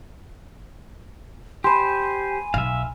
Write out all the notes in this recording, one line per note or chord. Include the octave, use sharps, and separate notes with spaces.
G4 C5 G#5 B5 C6
B1 E5 F5